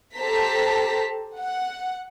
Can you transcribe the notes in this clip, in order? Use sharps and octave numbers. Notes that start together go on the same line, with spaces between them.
G4 A4 C5 A5 A#5 B6
F#5